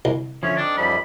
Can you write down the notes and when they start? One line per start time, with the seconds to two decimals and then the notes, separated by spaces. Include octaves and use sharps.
0.05 C2
0.43 D3 F3 C#4 C#5 E5
0.57 C4 D4 D#4 A4 D5
0.77 F#2 F3 G3 B5